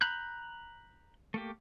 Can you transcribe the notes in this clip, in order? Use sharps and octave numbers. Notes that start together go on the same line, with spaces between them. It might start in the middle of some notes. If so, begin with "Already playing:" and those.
A#5 B5 F#6 G6
A3 A#3 G4